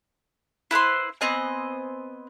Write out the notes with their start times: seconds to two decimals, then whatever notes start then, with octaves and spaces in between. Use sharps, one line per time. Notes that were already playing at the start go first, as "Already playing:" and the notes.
0.71 E4 B4 C5 C6
1.21 B3 C4 D#5 G#5